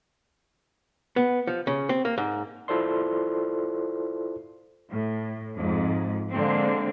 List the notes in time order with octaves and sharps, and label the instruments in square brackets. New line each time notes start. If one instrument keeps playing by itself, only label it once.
[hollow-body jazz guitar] B3
F3
C#3
C4
A#3
G#2
[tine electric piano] E4 F4 A4 C5 D5 C6
[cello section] A2
F2 G#2
D3 G#3 A#3 C4